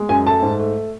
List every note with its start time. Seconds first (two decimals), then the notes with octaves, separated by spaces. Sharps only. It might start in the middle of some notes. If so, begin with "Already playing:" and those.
Already playing: G#3
0.09 F#2 G#5
0.27 A3 A5
0.42 G#2
0.59 A3